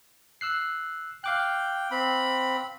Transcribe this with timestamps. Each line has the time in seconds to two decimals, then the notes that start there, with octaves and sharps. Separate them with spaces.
0.41 E6 F#6 C7
1.24 F5 G5 D6 F#6
1.91 C4 B5